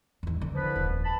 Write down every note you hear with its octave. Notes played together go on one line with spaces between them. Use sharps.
E2 D#3
D3
C2 F3 B4
D#1
A5 B5